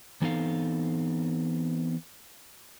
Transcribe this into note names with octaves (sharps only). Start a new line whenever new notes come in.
E3 B3 C4 D#4 A4 F5